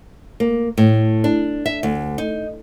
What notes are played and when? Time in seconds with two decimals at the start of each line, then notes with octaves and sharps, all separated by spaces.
0.40 A#3
0.77 A2
1.24 D4
1.66 E5
1.83 D2
2.18 D#4